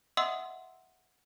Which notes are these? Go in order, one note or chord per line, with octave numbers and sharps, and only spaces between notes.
D#5 E5 F#5 C6 D#6 E6